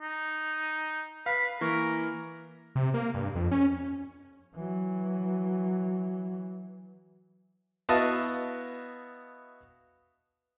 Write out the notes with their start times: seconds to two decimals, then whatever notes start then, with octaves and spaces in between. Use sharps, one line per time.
0.01 D#4
1.26 B4 F5 C7
1.61 E3 A#3 A#4 C#6
2.75 C3
2.94 A#3
3.14 G2
3.35 F2
3.51 C#4
4.55 E3 F#3
7.89 B3 E4 F#4 D#5 F5 A5